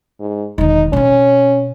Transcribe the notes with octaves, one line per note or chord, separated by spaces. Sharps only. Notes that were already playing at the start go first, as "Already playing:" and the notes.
G#2
E1 D#3 D#4
B2 C4 C#4